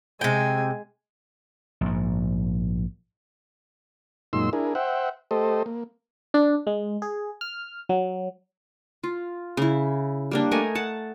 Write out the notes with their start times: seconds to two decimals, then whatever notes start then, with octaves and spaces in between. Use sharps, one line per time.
0.21 C3 G#3 G5 G#5
1.81 A#1 G#2
4.33 F#2 A#2 G#3 D#4 C6 E6
4.53 D4 E4 G#4 A#4
4.75 C5 E5 F#5 G5
5.31 A3 G4 A4 C5 D#5
5.66 A#3
6.34 D4
6.67 G#3
7.02 G#4
7.41 F6
7.89 F#3
9.03 F4
9.57 C#3 E4
10.31 G3 A#3 D4
10.51 A3 A#4 D#5 G#5
10.75 F#5 A5